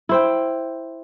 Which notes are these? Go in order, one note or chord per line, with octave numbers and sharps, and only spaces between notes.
E4 C5 G5